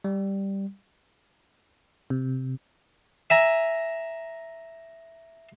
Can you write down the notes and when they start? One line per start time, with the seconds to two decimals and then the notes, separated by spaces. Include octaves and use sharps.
0.04 G3
2.10 C3
3.30 E5 G#5 A#5